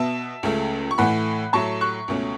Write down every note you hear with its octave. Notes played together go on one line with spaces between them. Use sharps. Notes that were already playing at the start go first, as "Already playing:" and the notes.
Already playing: B2 B3 E5 A5
C#2 C#3 A3
C#6
A2 E3 A3 F#5 B5
A2 F#3 A3 A5 C#6
C#6 F#6
C#2 B2 A3 C#4